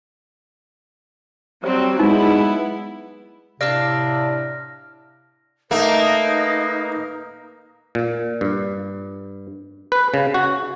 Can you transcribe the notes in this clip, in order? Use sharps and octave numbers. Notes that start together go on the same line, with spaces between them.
F#3 G3 C4 C5
G#3 B3 D#4 E4
A2 C3 D4 D5 F5 F6 A#6
A3 A#3 D#4 B4
A#2
G2
B4
C#3
F#4